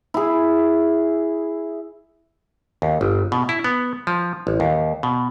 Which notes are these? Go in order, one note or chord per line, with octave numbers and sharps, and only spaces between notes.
E4 G#4
D#2
G1
B2
E4
B3
F3
A1
D#2
B2